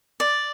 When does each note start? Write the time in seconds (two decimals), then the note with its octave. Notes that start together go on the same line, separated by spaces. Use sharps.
0.20 D5